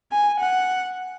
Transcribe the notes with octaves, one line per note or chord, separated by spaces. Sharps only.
G#5
F#5